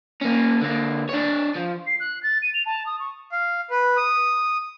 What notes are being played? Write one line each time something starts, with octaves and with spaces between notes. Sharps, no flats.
A#3 C#4
D3 A#3
D4 C#5
F3
C7
F#6
A6
D#7
F7
A5
D#6
C#6
F5
B4
D#6